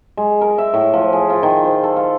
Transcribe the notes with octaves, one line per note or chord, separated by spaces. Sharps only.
G#3
A#4
E5
A2
F3
G#4
F4
D#3
C5
A4
F5